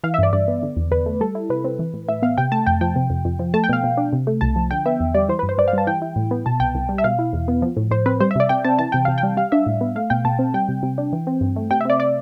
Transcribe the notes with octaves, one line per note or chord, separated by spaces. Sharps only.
E3 F5
E5
G2 D5
G2 D5
B3
D3
E2
E2 B4
A3
G3 A4
E4
C3 B4
C4
E3
A2
A2 E5
B3 F5
C3 G5
A3 A5
F2 G5
F3 G5
C3
F2
F2
F3
A3 A5
G5
B2 F5
B2
D4
C3
A3
C2 A5
F3
D3 G5
B3 E5
E2
G3 D5
E3 C5
B4
G2
C5
G2 D5
F5
G3 A5
E3 G5
E4
A2
B3
B2 A5
C2 G5
C2
G3
E5
B2 F5
E4
E2
B3
F3
A2
A2 C5
C4 B4
G3 C5
E5
C3 D5
C3 G5
C4 A5
E3 A5
C3 G5
C3 F5
G5
G3
G3 F5
D4 E5
A2
B3
A3 F5
B2 G5
B2 A5
C4
G3 G5
C3
C3
D4
E3
C4
G2
A3
C3 G5
E5
C4 D5
D5